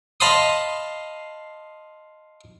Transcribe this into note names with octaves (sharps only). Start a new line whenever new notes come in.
D#5 F5 A5 B5 C6 D#6